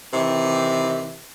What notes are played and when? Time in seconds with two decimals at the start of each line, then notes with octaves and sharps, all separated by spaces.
0.13 C3 D#3 E3